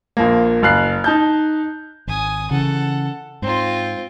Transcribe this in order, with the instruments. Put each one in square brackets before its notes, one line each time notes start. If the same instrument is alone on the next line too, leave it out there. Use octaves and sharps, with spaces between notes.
[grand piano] A#1 F3 A#3
F#1 F5 F#6 C7
D#4 A5 G6
[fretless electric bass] G#1 [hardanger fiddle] G#5 D#6
[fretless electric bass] C#3 E3 [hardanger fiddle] A4 F#5
[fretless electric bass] G#2 [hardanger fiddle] C4 F4